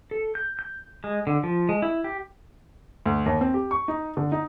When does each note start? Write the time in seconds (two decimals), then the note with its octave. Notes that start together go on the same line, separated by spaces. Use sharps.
0.11 A4
0.35 G6
0.59 G6
1.04 G#3
1.27 D3
1.43 F3
1.69 G#3
1.82 E4
2.04 G4
3.06 D2
3.26 D#2
3.41 C4
3.54 G4
3.71 C#6
3.88 D#4
4.17 D3
4.32 D#4